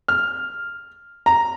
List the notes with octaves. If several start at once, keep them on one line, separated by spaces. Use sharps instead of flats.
F6
A#5